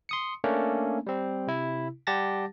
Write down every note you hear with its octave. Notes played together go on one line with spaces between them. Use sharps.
C6 D#6 C#7
A3 A#3 C#4 D4
G3 C4
C3 E4
G3 G4 F#5 A5 A6 A#6